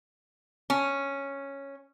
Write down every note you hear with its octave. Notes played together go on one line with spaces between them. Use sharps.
C#4